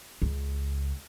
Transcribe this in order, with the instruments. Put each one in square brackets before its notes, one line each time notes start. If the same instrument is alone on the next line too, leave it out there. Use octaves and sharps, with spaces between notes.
[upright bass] C#2